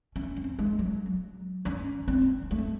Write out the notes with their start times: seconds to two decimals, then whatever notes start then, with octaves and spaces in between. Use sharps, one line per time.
0.16 C#4
0.36 C4
0.59 G#3
0.79 F#3
1.65 C#4
2.08 C4
2.51 A3